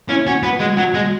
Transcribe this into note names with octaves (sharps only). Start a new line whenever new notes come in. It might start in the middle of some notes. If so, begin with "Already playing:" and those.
C#4 E4
C#4 F#4
B3 F#4
G#3 F#4
F#3 F#4
G#3